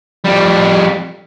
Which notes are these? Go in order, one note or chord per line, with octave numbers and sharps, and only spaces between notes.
F2 G3